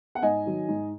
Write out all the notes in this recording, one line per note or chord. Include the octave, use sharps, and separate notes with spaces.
F#5
G#2 D#5 G#5
D#3 F#3
G#2